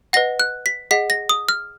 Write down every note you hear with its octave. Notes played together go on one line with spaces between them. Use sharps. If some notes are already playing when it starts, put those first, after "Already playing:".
B4 D#5 F#5 A#6
F#6
B6
G#4 D#5 F#5 B6
A#6
D#6
F6